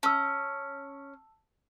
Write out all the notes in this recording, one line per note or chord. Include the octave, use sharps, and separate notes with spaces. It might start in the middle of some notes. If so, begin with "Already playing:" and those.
C#4 A5 E6